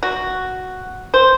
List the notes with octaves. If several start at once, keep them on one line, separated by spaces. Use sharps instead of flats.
F#4
C5